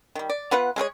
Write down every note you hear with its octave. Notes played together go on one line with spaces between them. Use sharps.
D#3 G3
D5
B3 F4 B4 F#5
G#3 A3 G#4 C#5